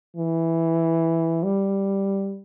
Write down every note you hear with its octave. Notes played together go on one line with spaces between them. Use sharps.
E3
G3